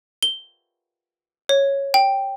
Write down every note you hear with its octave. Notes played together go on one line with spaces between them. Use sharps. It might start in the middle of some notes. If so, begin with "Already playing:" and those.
G7
C#5
G5